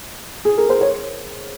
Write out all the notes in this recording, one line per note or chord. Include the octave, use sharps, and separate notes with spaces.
G#4
A#4
C5
C#5